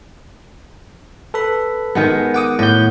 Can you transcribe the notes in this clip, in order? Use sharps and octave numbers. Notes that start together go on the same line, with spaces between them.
A4 B4 B5
D#3 G#3 B3
F#5 D6 D#6
A2 F#5 G6